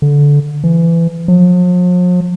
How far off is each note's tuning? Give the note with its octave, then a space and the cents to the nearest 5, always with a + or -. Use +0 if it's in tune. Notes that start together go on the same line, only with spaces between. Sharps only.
D3 -20
E3 +25
F3 +45